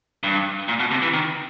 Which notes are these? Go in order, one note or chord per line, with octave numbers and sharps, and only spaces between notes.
G2
A#2
B2
C3
E3
D#3